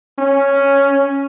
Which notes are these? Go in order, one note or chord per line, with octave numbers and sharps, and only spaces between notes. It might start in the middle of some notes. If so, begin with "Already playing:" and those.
C#4